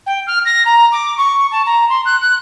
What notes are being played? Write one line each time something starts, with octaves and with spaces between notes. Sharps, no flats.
G5
F6
A#6
A#5
D6
C#6
A5
A#5
C6
F#6
F#6